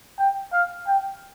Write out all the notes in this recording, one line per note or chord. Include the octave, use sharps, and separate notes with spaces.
G5
F5
G5